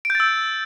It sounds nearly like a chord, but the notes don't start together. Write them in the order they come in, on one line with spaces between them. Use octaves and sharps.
D7 G6 A6 E6